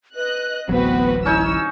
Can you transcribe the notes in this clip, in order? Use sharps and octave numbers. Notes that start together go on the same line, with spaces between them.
B4 D#5 F#6
D1 A1 F#3 B3 C4 F#4 B4
C#4 D#4 E4 C#5 E6